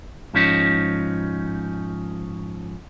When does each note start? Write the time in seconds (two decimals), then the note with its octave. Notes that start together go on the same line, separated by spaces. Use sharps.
0.34 G#2 F3 C#4 D#4